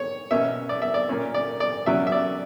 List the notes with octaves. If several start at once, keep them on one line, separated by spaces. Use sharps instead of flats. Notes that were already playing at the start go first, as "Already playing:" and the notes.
Already playing: C#5
B2 A#3 C#4 E5
D5
E5
D5
A#2 A#3 C#4
D5
D5
C#3 F#3 C#4 E5
E5
D5